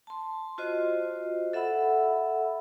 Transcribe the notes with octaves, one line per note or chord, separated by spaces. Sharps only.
A5 C6
F4 F#4 C5 D#5
A4 E5 F#5 B5 E6